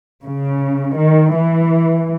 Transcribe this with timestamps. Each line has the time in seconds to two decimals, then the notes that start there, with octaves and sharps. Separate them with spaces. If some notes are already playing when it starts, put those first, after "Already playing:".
0.24 C#3
0.98 D#3
1.36 E3